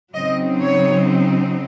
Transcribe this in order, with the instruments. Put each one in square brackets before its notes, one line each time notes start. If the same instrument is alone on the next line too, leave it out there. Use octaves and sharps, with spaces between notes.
[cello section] C#3 F#3 C4 D#4 D#5
C#5